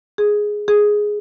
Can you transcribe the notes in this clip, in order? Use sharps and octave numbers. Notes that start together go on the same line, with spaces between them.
G#4
G#4